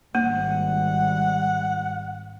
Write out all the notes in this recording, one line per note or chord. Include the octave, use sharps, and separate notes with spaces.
G#1 G3 A#3 F#5